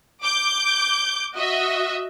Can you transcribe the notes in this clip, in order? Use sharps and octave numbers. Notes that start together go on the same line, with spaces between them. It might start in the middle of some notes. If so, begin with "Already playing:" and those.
D6 G6
F#4 D#5 E5